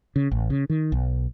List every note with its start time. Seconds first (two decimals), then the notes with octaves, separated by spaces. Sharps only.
0.16 C#3
0.31 A1
0.50 C#3
0.70 D#3
0.92 B1